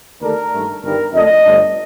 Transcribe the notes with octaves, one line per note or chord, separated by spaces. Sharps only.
D#2 D3 A3 D4 A#4
G2 D#3 A3
G1 G2 D#3 G3 D4 A#4
F2 D3 A3 D4 D#5
G1 G2 D3 A3 D4